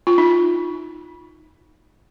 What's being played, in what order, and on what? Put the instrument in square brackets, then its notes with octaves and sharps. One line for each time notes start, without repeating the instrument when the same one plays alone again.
[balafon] F4
D#4